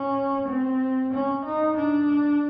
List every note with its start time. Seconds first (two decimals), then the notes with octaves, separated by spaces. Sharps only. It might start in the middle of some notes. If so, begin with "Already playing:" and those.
Already playing: C#4
0.48 C4
1.12 C#4
1.44 D#4
1.76 D4